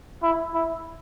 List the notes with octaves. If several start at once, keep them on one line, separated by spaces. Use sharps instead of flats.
E4
E4